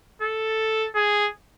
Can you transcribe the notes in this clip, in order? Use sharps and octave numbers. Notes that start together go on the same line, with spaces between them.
A4
G#4